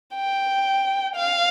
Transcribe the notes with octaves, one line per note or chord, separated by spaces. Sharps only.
G5
F5